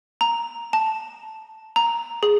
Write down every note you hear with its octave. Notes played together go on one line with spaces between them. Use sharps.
A#5
A5
A#5
G#4